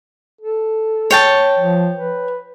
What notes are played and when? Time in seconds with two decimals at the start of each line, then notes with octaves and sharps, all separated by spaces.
0.41 A4
1.11 C#5 G5 A5
1.59 F3
1.97 B4